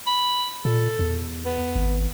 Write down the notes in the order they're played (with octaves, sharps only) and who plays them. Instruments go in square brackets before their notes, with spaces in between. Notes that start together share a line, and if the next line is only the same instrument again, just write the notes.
[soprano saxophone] B5
[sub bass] A#2 [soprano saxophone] A4
[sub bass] E2
[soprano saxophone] B3
[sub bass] G#1